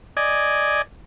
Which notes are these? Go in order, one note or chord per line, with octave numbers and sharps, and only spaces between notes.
D5 D#5 G#5